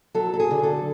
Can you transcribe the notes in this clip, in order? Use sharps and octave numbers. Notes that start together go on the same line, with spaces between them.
F#3 A4
A4
G#4
D3
A4